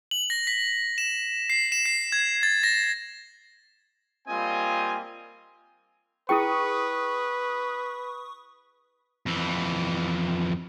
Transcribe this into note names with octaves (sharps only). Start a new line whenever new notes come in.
F#7
A#6
B6
E7
C7
E7
C7
G#6
A6
A#6
G3 A#3 C4 F4 D#5 G#5
E4 G#4 B4 G5 C#6 D#6
F2 E3